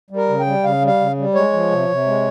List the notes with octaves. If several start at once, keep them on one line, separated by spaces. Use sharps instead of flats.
G3
A#4
C#3
G5
G3
C#3 F5
G3
F5
C#3
G3
G#3 C#5
F3
C3
C3
G#3